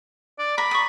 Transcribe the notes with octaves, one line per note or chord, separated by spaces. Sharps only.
D5
A#4 B5
C#6 D#6